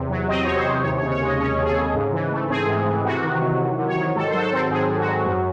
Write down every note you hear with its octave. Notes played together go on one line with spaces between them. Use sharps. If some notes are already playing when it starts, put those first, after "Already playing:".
Already playing: E2 C3
F#3
C4 D#5
E2 C#5
C5
C3
D#2 C#5
C#5
C#3
C#5
G#3 D#5
C#4 C#5
D#2
G#4
A4
C#3
G#2
E3
A3
C4 G#4
G#2
E3
C3 F#4
D#3
F#3
C3
C3
C#5
D#3
G#2 A4
C5
F#3
A4
C4
G#2 G#4
G#2
F#4
F#3
F#2